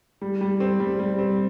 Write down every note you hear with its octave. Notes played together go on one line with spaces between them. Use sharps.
G3
G3
C4
G3
G3
C4